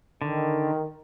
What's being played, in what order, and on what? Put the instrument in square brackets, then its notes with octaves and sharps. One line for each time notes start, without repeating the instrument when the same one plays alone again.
[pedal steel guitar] D3 [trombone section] D#3